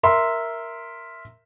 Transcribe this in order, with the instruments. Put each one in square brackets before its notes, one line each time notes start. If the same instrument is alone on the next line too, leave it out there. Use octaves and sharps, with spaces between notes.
[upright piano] A#4 E5 C6